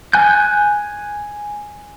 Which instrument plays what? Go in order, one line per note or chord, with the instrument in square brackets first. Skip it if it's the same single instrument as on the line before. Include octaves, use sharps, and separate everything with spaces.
[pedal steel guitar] G#5 F#6 G6